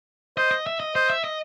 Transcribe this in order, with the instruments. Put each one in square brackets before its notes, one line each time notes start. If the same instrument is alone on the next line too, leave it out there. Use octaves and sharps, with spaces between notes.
[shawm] C5 [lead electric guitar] D#5
[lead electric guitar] D#5
E5
D#5
[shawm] C5 [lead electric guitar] D#5
[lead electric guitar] E5
D#5